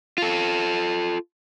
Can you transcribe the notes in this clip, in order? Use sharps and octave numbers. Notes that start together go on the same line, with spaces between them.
F4 A4